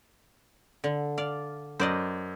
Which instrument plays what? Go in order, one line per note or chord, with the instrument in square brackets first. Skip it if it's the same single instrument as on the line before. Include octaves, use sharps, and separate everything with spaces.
[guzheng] D3
D5 F5
[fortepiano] F#2 [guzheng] C5 D5 D#5